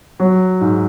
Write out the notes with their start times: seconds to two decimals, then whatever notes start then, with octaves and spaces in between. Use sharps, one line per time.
0.20 F#3
0.61 G#2